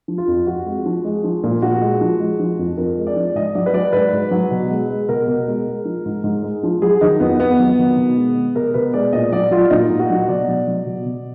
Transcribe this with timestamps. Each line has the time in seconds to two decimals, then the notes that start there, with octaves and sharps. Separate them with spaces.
0.08 F3
0.18 F4
0.28 F2
0.47 F2 F#4
0.66 G#3
0.86 F3
1.05 G#3
1.24 F3
1.43 A#2
1.62 A#2 F#4
1.81 G#3
2.01 F3
2.20 G#3
2.40 F3
2.59 F2
2.77 F2 A#4
2.98 G#3
3.07 D5
3.16 F3
3.35 G#2 D#5
3.55 F#3 D5
3.66 B4
3.74 F#3 D5
3.93 G#2 B4
4.13 G#2
4.31 F#3
4.51 B2
4.70 G#3
4.89 G#3
5.09 B2 A#4
5.28 B2
5.47 G#3
5.67 G#3
5.85 F3
6.06 G#2
6.24 G#2
6.43 G#3
6.63 F3
6.82 F#3 G#4
7.01 D#3 D#4
7.20 F2 B3
7.40 F2 B3
7.60 F#3
7.78 D#3
7.97 B2
8.17 G#3
8.36 G#3
8.56 B2 A#4
8.74 B2 B4
8.94 G#3 D5
9.13 A#2 D#5
9.32 F#3 D5
9.51 F#3 F4
9.70 A#2 D#4
9.90 A#2
10.00 F#4
10.10 F#3
10.29 B2 D5
10.48 F#3
10.68 F#3
10.86 B2
11.06 B2